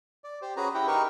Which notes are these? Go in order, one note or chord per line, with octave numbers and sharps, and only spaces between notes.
D5
G4 C5
C#4 F#4 G#4 B4 A#5
E4 G4 F#5 G5
D#4 G4 A#4 B4 C#6